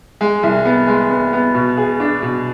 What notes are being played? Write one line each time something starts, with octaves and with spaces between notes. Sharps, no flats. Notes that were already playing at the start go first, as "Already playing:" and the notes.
G#3
C2
B3
G#3
B3
B3
B2
G#4
D4
B2